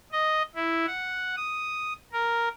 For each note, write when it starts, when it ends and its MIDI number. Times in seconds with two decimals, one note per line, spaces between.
0.12 0.42 75
0.55 0.86 64
0.86 1.35 78
1.37 1.93 87
2.12 2.48 70